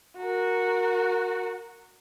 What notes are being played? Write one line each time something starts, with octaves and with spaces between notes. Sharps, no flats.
F#4 A#4